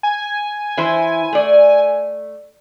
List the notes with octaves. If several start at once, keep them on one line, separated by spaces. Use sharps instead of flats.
G#5
E3 E4 C5
A3 D5